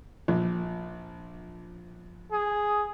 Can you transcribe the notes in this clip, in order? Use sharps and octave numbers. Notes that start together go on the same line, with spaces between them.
A#1
G#4